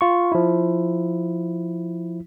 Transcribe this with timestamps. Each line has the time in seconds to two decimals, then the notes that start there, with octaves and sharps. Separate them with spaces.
0.01 F4 C#6
0.32 F3 E4